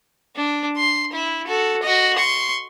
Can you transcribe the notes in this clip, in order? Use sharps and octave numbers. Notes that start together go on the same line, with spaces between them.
D4
C6
E4
F#4 A4
F#4 D#5
C6 C#6